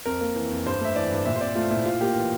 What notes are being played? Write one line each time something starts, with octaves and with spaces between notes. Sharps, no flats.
F2 A#4
A#3
E3
F2
G2 C5
A3 E5
E3 D5
G2
A#2 E5
C5
C4 D5
A3 F4
A#2 E4
A2 F4
A#3 G4
E3